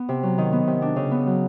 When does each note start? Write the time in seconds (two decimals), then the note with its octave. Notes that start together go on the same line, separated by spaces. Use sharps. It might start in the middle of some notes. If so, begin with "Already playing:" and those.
Already playing: B3
0.09 C3
0.23 F#3
0.38 D#3
0.52 B3
0.67 C3
0.82 D4
0.96 C#3
1.11 B3
1.27 F#3